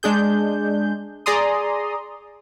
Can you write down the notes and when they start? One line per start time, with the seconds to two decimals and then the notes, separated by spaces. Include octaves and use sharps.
0.03 G#3 D4 G#4 G6
1.26 G#4 D5 A#5 C6 D#6